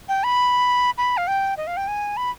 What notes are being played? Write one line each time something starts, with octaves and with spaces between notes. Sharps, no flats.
G5
B5
B5
F5
G5
D#5
F5
G5
G#5
B5